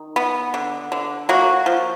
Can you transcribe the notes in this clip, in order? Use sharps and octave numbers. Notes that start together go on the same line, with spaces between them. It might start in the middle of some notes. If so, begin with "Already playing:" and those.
Already playing: D#3
B3
D3
D3
F#3 A#3 F#4
F3